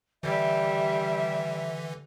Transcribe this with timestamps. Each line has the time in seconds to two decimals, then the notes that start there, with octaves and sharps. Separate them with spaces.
0.23 D3 E3 G3 E5